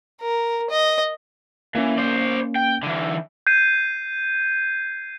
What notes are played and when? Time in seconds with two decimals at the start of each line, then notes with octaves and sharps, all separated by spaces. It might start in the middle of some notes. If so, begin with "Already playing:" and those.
0.22 A#4
0.70 D#5
1.75 E3 A#3 C#4
1.98 C5 D5
2.55 G5
2.83 D3 E3
3.47 G6 G#6 C7 D#7